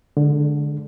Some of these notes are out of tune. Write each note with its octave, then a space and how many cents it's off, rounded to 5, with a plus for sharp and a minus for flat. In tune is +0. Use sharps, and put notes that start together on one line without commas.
D3 +0 G#3 +35